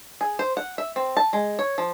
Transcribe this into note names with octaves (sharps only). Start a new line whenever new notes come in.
G#4
C5
F#5
E5
C4
A5
G#3
C#5
F3